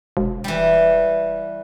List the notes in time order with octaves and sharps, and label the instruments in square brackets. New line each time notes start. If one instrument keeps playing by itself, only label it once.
[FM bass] E1
[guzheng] E3 G3